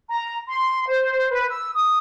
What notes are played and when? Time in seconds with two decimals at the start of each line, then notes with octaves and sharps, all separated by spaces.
0.10 A#5
0.47 C6
0.87 C5
1.29 B4
1.49 E6
1.74 D#6